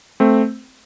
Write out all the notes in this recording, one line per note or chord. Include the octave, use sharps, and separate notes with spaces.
A3 C4